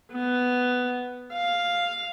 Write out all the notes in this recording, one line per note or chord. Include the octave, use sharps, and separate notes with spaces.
B3
F5